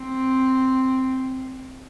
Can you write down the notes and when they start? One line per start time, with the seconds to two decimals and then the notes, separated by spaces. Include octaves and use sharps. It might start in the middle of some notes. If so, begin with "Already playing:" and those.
Already playing: C4